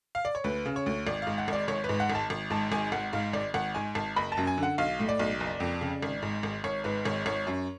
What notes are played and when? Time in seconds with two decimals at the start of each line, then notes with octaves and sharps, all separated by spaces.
0.15 F5
0.25 D5
0.35 C#5
0.44 D2 B4
0.66 C#3
0.76 C#5
0.86 D2
1.07 G#1 D5
1.22 G#2 F5
1.38 F#5
1.48 G#1 D5
1.68 G#1 C#5
1.84 B4
1.89 G#2
2.00 F#5
2.10 G#1
2.15 A5
2.30 G#1
2.50 G#2 A5
2.72 G#1 G#5
2.92 G#1 F#5
3.13 G#2 F5
3.33 G#1 D5
3.54 G#1 F#5
3.74 G#2 G#5
3.95 G#1 A5
4.16 F#1 B5
4.32 A5
4.37 F#2
4.47 G#5
4.58 D3
4.63 F#5
4.78 B1 F5
4.99 A2
5.09 D5
5.19 B1
5.40 F#1
5.60 F2
5.81 C#3
6.03 G#1
6.22 G#2
6.43 G#1
6.64 G#1 C#5
6.84 G#2 B4
7.05 G#1 C#5
7.26 G#1 C#5
7.47 F#2